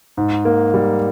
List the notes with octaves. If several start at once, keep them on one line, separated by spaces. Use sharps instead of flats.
G#2
A#3
G3